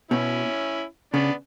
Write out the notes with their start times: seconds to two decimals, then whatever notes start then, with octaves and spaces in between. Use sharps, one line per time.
0.11 B2 C#4 E4
1.13 C#3 B3 D4